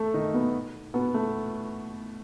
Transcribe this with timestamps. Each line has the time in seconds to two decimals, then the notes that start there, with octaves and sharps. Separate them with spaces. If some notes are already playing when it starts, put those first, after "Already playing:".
Already playing: A3 A4
0.14 D#3 D#4
0.33 B2 B3
0.94 B2 B3
1.14 A3